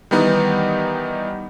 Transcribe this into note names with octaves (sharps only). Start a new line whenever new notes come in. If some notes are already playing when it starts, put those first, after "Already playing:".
D#3 E3 G3 B3 D#4